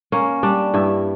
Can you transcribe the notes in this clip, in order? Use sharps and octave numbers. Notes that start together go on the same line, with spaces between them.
A#3 C#4
G3 D4
G2 E4